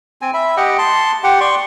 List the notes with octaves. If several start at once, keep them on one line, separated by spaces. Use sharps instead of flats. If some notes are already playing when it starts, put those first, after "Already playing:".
C4 G#5
E5 B5
G4 D#5 F#5 G5
A5 C6
G4 F#5 G5
D5 C6 C#6